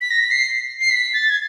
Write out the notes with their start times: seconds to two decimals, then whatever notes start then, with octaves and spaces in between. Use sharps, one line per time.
0.01 B6
0.11 A#6
0.20 B6
0.31 C7
0.81 C7
0.91 B6
1.14 A6
1.30 G#6